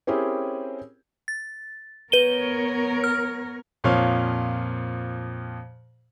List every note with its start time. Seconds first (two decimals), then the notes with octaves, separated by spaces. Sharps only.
0.07 C4 C#4 E4 G4 G#4 A#4
1.28 A6
2.12 B3 A#4 B4 C#5 D#7 G7
3.04 F6
3.84 F2 A#2 F3 C#5 F5